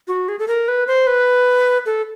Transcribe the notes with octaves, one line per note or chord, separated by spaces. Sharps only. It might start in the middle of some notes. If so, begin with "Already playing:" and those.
F#4
G#4
A4
A#4
B4
C5
B4
A4